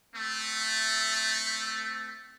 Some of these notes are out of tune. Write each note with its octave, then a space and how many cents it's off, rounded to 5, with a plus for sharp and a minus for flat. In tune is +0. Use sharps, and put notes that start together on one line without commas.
A3 +0 C4 -15